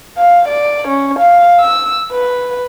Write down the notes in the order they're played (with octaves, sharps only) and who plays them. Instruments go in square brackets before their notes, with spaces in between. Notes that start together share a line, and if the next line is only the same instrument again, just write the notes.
[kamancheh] F5
D5
C#4
F5
E6
B4